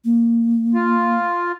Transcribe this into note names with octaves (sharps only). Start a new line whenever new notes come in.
A#3
F4